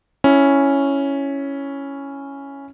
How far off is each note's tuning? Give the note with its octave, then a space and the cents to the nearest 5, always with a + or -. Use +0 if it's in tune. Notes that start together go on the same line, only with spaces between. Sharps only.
C#4 +0 E4 +0